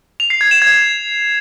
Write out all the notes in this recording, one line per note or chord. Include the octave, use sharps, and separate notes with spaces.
F7
C7
G#6
E7
G#6